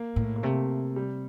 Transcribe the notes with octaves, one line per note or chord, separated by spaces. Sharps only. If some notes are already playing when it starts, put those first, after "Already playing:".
Already playing: A#3
A2
A#3
C3 A3
G3